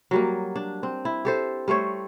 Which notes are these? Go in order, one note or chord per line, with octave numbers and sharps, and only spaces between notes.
F#3 G3 A#3
D4
C4
E4
G4 A4 C5
G3 A3 C5 C#5